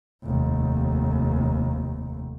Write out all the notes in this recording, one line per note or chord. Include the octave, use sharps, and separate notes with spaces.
F1 D#2